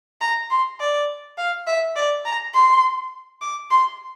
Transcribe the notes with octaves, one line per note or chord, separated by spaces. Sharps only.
A#5
C6
D5
F5
E5
D5
A#5
C6
D6
C6